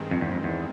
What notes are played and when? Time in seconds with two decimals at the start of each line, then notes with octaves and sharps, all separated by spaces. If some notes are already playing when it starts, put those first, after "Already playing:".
Already playing: G2 D#3 G#3 C4
0.11 F2
0.21 E2
0.32 F2
0.44 E2